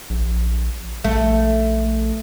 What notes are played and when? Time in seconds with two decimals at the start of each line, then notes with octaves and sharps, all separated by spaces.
0.10 A#1
1.04 A#1 A3